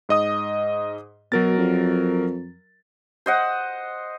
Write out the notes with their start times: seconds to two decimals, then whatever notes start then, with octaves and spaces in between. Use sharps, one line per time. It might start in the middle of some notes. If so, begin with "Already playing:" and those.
0.09 G#2 D#5 D#6
1.32 B2 F#3 A#4 A6
1.58 F2
3.26 C5 D#5 F#5